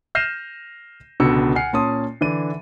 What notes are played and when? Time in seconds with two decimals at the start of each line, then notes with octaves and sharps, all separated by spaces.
0.15 F6 G6 A#6 C7 D#7 E7
1.20 C#2 B2 D3 E6 C#7
1.55 F#5 G#5 F6 C7 C#7
1.73 A#2 C#4 A5 C6 D#6
2.21 D3 E3 D4 D#7